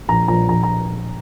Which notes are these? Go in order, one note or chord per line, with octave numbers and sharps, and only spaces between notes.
A#1 A#5
A#2 F3 A#5
A#1 A#5
A#5